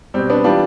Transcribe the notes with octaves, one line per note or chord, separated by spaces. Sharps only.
B2 G3 C4
B3 D4
E3 G3 D4 F4